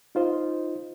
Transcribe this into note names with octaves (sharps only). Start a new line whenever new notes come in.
D#4 F4 C5 D#5